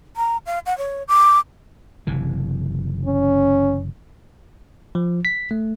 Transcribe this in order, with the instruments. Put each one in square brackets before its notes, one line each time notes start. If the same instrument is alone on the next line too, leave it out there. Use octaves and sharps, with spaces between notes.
[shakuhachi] A#5
F5
F#5
C#5
D6
[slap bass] F#1 C3 E3
[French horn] C#4
[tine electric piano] F3
B6
A3